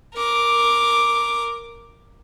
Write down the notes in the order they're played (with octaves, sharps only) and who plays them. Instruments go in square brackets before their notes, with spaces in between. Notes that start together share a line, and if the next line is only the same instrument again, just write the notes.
[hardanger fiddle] A#4 D6